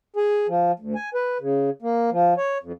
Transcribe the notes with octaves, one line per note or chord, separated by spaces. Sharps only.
G#4
F3
D2
G#5
B4
C#3
A#3
F3
C#5
F2